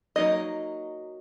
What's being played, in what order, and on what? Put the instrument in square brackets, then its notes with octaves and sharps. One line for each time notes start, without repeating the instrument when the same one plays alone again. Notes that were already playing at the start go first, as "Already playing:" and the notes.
[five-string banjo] F#3 A#3 D#4 D#5